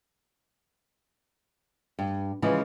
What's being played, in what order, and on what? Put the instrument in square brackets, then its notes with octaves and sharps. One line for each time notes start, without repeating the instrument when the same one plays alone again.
[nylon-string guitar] G2
C#3 E3 F3 G#3 G#4